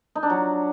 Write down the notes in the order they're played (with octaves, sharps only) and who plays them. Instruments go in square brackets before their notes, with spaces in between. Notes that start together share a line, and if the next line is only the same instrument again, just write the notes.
[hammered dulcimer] D#4
D4
F#3